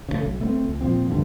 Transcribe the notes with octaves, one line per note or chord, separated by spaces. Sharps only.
C#3 F3 A3
B1
A3 B3 C4
C#2
A#2 F3 C4
D2 G2 D3